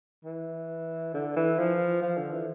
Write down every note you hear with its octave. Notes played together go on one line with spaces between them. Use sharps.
E3
D3
E3
F3
F3
D3
E3